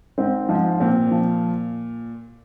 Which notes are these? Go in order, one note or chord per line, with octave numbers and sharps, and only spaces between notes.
G#2 C4
G#2 F3
A#2 C4
F3